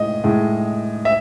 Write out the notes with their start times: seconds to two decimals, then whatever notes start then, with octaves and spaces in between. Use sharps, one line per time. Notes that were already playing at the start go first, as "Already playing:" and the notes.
Already playing: A2 G#3 D#5
0.24 A2 G#3
1.05 E5